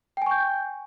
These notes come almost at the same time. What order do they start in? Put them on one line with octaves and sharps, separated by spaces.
G5 G#5 C#6 G6